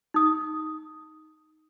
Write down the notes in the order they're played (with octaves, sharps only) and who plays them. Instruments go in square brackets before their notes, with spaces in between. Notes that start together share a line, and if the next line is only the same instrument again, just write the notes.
[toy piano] D#4 D#6